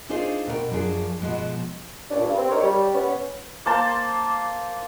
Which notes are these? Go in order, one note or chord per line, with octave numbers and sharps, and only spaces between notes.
D4 D#4 F4 G#4 C5 C#5
B2 A#4 C#5 G5
F#2 F3 D4 G#4
B2 F3 G#3 B3
G2 A#2 C#4 D4
G2
C4
D4 D#4 G4 A#4 C#5
G3
B3 C#4
A#3 C5 A5